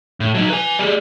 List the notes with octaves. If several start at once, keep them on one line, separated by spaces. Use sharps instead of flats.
A2
F#3 D#4
B4 G#5
G3 G#4